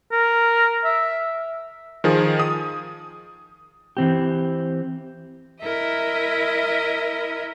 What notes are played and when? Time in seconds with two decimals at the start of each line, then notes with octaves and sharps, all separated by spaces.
0.12 A#4
0.84 E5
2.04 D#3 F3 G#4
2.39 D#6
3.97 E3 C4 G4
5.61 E4 A#4 D#5 E5